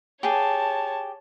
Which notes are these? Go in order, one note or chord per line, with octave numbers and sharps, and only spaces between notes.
G4 G#4 C#5 A5